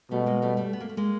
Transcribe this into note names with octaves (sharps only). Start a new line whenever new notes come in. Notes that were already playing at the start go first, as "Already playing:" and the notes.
B2 G3 A3
G#3 A#3
G3 A3
G3 A3
B3
A#3
A3
G#3 A#3